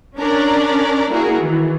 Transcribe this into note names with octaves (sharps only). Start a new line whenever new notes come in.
C#4 D4 A#4 D5
A#3 E4 F#4 G#4 A#4
D#3 E3